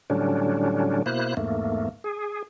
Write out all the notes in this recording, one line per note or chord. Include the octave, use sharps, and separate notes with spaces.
A2 D3 F#3 G3 C#4 D4
B2 A#3 E4 C5 F#6
E2 G#2 A3 A#3
G#4